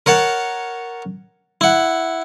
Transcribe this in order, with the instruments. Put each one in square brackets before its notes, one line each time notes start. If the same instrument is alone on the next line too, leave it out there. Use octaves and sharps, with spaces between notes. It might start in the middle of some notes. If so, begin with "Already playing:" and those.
[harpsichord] A#4 C#5 F#5 A5
E4 F#5